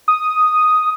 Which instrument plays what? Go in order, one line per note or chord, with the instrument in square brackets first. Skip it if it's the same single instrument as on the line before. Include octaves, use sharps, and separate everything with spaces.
[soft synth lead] D#6